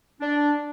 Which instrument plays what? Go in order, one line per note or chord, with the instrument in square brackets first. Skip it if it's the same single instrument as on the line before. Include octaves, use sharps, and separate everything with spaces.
[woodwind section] D4